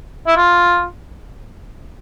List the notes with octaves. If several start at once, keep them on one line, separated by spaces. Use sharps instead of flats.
E4
F4